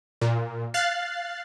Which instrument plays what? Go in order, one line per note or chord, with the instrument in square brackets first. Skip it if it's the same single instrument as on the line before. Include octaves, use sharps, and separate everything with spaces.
[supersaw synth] A#2
F5 F#6 A6 C7